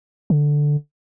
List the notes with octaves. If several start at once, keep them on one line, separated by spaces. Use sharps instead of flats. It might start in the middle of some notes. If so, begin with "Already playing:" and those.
D3